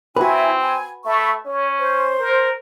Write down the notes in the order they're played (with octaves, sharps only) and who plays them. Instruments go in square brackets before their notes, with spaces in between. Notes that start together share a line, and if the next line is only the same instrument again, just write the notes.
[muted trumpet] C4 [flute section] E4 G#5 [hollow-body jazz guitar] F#4 B4
[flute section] G#5
[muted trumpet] A3 [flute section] E5 B5 C#6
[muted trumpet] C#4 [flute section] C#5
[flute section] C5
[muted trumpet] A#4